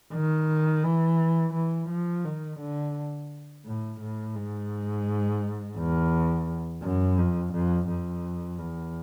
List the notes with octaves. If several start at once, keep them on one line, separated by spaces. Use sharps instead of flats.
D#3
E3
E3
F3
D#3
D3
A2
A2
G#2
E2
F#2
F2
F2
F2
E2